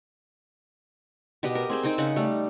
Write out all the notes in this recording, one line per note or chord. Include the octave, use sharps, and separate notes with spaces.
B2 G4 B4 D#5
A#4
C4 G#4 C5
C4 D#4 C5 G5
C#3 D#4 F#5
G3 A3